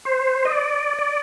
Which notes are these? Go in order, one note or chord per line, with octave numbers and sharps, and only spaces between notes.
C5
D#5
D5
D5